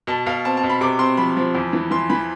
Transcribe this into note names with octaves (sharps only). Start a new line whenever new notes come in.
B2 A5
B2 F5
C4 A5
A5
B2
B5
C3 D6
C4 C6
F3 B5
F3
E2
E3
E3 C6
E3 B5